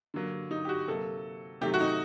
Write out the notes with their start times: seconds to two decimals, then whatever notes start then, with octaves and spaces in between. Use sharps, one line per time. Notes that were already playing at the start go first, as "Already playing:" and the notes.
0.14 D3 F#3 A#3
0.51 D#4
0.65 G4
0.69 F#4
0.88 C3 F#3 A#3 A4
1.61 C3 D#3 F#3 A3 G4
1.74 F#4
1.80 D#4